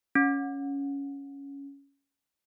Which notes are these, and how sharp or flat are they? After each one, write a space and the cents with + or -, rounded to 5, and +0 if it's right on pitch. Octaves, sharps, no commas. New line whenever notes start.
C#4 +5